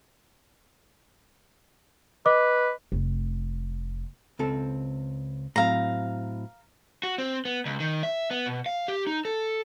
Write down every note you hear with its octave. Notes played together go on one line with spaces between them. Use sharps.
B4 D#5 D6
F1
C#2 C4 A4
A2 F#3 C4 F5 A#5
F#4
C4
B3
C#2
D#3
E5
B3
B2
F5
G4
D#4
A4